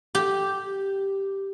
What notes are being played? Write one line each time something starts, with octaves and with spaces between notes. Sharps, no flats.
G4